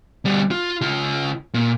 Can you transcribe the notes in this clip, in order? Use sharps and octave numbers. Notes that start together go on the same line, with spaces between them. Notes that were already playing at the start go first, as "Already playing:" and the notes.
D2 G3
F4
C#3 F4
A#2